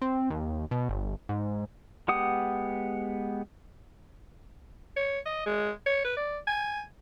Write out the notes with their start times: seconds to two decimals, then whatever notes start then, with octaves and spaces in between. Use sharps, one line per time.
0.02 C4
0.30 D#2
0.71 B2
0.89 G1
1.29 G#2
2.08 G#3 B3 G4 F#5 D#6
4.96 C#5
5.26 D#5
5.46 G#3
5.86 C#5
6.04 B4
6.17 D5
6.47 G#5